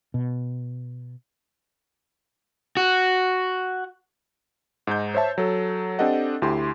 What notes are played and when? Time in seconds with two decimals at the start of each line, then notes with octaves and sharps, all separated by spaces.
0.14 B2
2.77 F#4
4.87 G#2 D#4 G6
5.14 C5 C#5 E5 A5
5.38 F#3 A4
5.99 C4 D4 G4 A4 D#5 F#5
6.42 D2 E4 G4 C6